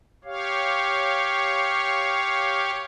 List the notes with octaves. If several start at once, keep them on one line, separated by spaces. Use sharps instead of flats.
G4 C#5 F5